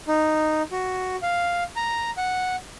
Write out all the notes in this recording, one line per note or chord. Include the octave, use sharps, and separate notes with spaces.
D#4
F#4
F5
A#5
F#5